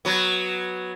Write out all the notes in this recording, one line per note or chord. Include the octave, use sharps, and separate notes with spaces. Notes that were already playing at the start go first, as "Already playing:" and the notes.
F#3 B3